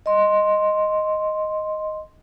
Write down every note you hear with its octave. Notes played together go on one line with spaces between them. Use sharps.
D#5 C6